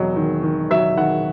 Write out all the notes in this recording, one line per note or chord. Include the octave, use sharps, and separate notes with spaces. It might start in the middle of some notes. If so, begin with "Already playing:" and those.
Already playing: E1 F#3 D#5
D#3
D#3
F#3 E5
D#3 F#5